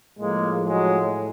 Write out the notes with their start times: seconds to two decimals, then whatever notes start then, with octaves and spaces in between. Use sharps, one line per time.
0.19 A2 F3 G#3 A#3
0.65 F#3 G#3